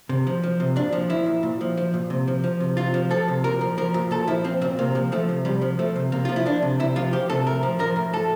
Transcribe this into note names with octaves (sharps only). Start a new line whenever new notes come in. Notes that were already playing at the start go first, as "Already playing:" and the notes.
C3
F3
F3
C3
A#2 D4
F3
F3 E4
A#2
A#2
F3
F3
A#2
C3
F3
F3
C3
C3 F4
F3
F3 A4
C3
A#2 A#4
F3
F3 A#4
A#2
A#2 A4
F3 E4
F3 C4
A#2 C4
C3 A#3
F3
F3 A3
C3
C3 G3
F3
F3 A3
C3
C3 A#3
F3 F4
E4
F3 D4
C3
C3 E4
F3 F4
F3 G4
C3 A4
A2 A#4
F3
F3 A#4
A2
A2 A4